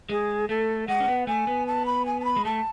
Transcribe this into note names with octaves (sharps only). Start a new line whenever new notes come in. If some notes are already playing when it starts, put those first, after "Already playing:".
G#3 G#4
A3 A4
G#3 F#5
C#4
B3
A3 G#5
B3
A5
B5
G#5
A5
B5
G#3
A3 A5